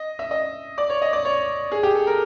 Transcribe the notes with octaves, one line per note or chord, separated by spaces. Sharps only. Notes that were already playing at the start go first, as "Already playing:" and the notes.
Already playing: D#5
E5
D#5
D5
C#5
D#5
D5
C#5
G#4
G4
A4
A#4